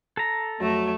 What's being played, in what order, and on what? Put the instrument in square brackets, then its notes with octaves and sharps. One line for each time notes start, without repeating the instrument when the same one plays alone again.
[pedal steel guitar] A4 A#5
[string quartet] F2 A3 [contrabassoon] F#3